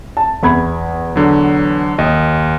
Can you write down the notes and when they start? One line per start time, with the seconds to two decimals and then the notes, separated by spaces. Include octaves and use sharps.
0.17 A5
0.43 E2 B5 G#6
1.16 D3 F#3
1.98 D#2 D#5